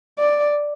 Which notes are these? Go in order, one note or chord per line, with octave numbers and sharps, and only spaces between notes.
D5